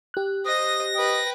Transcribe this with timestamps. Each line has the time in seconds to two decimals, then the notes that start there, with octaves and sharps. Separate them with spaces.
0.14 G4 F#6
0.46 C5 D#5 D#6 A#6
0.95 B4 D#5 G5